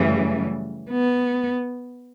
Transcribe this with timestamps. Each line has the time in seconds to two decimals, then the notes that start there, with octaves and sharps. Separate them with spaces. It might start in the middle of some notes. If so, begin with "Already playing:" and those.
Already playing: F#2 C#3 E3 G3 A3
0.90 B3